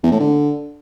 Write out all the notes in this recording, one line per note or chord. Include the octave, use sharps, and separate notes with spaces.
E2
A2
D3